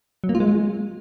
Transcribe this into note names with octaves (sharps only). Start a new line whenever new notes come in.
F#3
A#3
F4
G#3